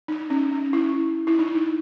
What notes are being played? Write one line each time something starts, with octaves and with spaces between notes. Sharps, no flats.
D#4
C#4
C#4
E4
E4
D#4
D#4